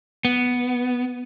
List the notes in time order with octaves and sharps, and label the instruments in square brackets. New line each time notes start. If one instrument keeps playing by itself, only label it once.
[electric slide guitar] B3